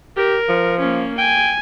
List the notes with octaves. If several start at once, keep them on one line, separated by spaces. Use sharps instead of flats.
G4 A#4
F3
A#3 C#4
G5 G#5